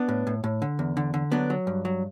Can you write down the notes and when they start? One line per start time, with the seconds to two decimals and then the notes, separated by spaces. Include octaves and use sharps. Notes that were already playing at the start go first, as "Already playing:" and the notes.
Already playing: B3 D4
0.09 A2
0.27 A2
0.44 A2
0.62 D3
0.79 E2
0.97 D3
1.14 D3
1.32 F#3 B3 D4
1.50 F#3
1.67 G2
1.85 F#3